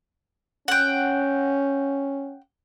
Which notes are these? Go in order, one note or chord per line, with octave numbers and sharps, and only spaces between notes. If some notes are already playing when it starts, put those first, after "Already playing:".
C#4 F#5 G5